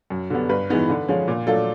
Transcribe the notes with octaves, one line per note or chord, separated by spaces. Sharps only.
F#2
D3 G3 B3
G2 B4
E3 G#3 B3 D#4
D3
F3 G#3 C#4
A#2
F#3 A3 D4 F4 A4